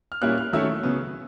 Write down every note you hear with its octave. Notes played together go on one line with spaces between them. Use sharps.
F6
A#2 G3 A#3 C#4 E4 F#6
F6
D#3 F#3 A3 C#4 E4 E6
C#3 F#3 B3